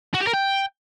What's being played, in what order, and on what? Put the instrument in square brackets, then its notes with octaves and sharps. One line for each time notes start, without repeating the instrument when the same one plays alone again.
[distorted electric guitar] F#4
G4
A#4
G5